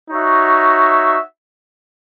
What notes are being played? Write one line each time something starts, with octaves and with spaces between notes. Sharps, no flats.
D#4 F#4 C#5 E5